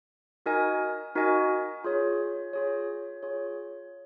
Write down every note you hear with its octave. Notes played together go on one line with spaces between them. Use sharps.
D#4 F#4 A#4 D#5 G#5
D#4 F#4 A#4 D#5 G#5
F4 G#4 C#5
F4 G#4 C#5
F4 G#4 C#5